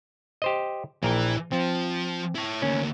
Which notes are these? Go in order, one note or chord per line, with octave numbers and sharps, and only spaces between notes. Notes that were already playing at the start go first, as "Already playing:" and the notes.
G4 C5 D#5
A#1 E3 A#4 G5
F3 C4
E4 C#5
D2 A#3 C#4